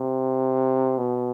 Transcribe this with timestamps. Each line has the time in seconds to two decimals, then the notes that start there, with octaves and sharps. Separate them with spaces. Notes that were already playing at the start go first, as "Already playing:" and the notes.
Already playing: C3
0.98 B2